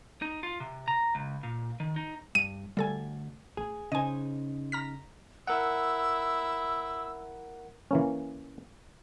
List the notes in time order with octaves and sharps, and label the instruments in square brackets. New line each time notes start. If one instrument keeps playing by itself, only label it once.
[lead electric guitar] D#4
F4
C3
A#5
C#2
A#2
D#3
D#4
[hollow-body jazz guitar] G2 [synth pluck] D#7
[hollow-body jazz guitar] D2 [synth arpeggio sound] G3 A4 G#5
[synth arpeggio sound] A1 [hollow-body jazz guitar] G#4
[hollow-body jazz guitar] C#3 D#4 C5 [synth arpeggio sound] D#5 G#5
[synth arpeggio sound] A#5 F6 B6
[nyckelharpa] E4 [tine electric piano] A#4 F#5 [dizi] E6
[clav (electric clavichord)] E3 A#3 C#4